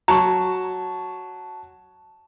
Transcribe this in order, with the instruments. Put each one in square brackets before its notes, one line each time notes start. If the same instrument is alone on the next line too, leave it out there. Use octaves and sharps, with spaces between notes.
[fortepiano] F#3 [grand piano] A5 C#6 [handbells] A#5